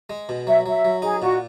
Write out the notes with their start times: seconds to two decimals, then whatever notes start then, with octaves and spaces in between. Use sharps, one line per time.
0.10 G#3
0.29 B2
0.47 F#3 E5
0.66 F#3 E5
0.85 F#3
1.02 D#4 G#4
1.21 A#2 F#4